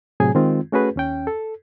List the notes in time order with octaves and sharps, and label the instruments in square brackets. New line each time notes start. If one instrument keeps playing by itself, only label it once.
[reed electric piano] A2 C3 F#3 G#4 G#5
D#3 G#3 C4 F4
A3 C#4 F#4 G#4 B4
D#2 C#4 G5
A4